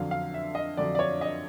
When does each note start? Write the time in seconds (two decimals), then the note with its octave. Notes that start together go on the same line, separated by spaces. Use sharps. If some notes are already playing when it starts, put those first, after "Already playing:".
Already playing: F2 D3 F#3 F5
0.11 F5
0.34 E5
0.55 D#5
0.77 F2 D3 F#3 D5
0.95 D5
0.99 C#5
1.21 D#5